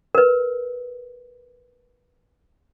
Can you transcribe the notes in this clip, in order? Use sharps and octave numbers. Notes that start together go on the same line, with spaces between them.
A#4 B4